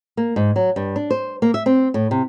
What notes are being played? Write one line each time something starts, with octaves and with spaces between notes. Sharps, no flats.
A#3
G#2
F#3
G2
D4
C5
A#3
E5
C4
A2
C3